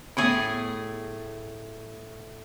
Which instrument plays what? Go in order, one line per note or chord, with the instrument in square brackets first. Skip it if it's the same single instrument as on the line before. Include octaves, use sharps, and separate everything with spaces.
[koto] A2 A3 G#4 [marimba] B3